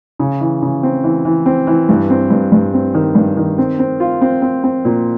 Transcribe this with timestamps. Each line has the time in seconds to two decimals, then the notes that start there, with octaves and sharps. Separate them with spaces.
0.19 C#3
0.41 E3
0.62 C#3
0.83 C4
1.04 E3
1.25 E3
1.46 C4
1.67 E3
1.89 G2
2.10 C4
2.30 G2
2.52 G2
2.74 C4
2.94 D#3
3.15 G2
3.37 D#3
3.58 C4
3.79 C4
4.00 F4
4.21 C4
4.42 C4
4.64 C4
4.85 A#2